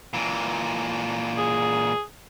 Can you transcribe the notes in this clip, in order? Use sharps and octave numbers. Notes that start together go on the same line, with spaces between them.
A#2 E3
G#4